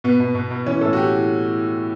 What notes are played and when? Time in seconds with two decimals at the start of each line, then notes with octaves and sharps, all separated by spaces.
0.04 B2 B3
0.20 B2
0.35 B2
0.51 B2
0.66 E3 C#4
0.81 A2 A4
0.93 F#4
0.96 E3 G4